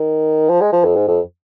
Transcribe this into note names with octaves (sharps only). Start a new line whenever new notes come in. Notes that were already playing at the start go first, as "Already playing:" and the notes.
Already playing: D#3
F3
G#3
F3
F2
G#2
F2